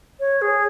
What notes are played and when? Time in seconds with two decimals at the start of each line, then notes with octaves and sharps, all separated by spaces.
0.20 C#5
0.41 G#4